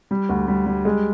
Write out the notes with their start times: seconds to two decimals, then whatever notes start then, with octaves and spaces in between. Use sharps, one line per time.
0.11 G3
0.29 D2
0.48 G3
0.66 G3
0.85 G#3